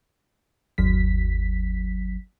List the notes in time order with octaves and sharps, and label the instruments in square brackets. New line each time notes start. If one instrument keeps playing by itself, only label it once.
[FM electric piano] G1 D#2 F#3 B6